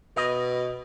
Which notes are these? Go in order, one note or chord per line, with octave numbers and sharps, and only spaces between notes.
B2 D#5